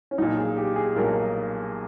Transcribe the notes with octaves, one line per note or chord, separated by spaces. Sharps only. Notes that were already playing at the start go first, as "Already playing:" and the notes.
C#4
B1 A#2 D#4
G#4
G4
G#4
B1 A#2 A#4